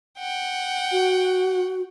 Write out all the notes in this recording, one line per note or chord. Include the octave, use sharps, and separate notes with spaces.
F#5 G5
F#4